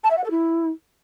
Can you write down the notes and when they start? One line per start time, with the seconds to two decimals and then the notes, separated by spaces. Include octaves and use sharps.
0.03 A5
0.10 E5
0.17 F#5
0.24 A4
0.30 E4